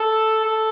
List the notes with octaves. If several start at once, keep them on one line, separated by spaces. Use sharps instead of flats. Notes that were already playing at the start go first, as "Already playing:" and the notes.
Already playing: A4
A4